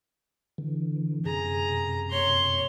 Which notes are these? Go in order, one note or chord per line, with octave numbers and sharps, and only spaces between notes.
D3 E3
F#2 C3 G#4 A#5
C#5 C6